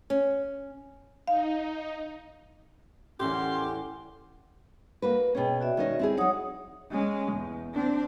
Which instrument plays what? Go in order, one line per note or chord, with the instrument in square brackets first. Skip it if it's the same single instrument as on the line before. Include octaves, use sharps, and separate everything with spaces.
[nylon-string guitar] C#4
[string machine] D#4 [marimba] F5
[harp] E2 A2 [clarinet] C#4 [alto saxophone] G4 [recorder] C6
[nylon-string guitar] A#3 F#4 B4
[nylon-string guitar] B2 C#4 [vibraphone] G#4 B4 G5
[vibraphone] F#4 D5 E5
[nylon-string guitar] D#3 C#4 D#5
C4 E4 G#4
[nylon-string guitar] F#3 D#4 [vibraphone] C#5 F#5 D#6
[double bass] G#3 C#4
E2
C4 D4